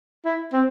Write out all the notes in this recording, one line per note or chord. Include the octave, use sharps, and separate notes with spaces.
E4
C4